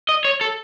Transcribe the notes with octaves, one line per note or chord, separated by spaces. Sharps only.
D#5
C#5
A4